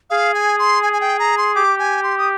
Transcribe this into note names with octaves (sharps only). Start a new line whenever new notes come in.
G#4 F5
G#5
C6
G#5
G#5
G5
A#5
C6
G4 D6
G#5
C6
D#6